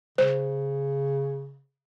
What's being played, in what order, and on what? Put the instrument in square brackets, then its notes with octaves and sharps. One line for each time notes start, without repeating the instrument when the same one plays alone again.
[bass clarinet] C#3 [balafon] C5